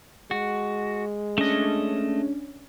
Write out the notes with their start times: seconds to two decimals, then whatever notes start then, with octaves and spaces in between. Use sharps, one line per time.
0.31 G#3 F#4
1.38 A3 C#4 D4 D#5